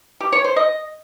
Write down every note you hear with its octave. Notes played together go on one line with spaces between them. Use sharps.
G4
C#5
C5
D#5